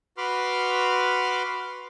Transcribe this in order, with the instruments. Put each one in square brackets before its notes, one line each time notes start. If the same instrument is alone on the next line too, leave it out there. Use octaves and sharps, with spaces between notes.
[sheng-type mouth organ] F#4 B4 B5 C6 D6 F6